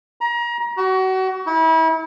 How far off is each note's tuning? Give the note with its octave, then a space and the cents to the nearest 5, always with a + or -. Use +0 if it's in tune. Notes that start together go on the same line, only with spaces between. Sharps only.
A#5 +30
F#4 +30
E4 -35